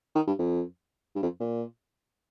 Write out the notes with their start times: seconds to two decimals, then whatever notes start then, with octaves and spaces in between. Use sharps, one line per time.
0.16 D#3
0.28 G2
0.39 F2
1.15 G2
1.23 F2
1.40 A#2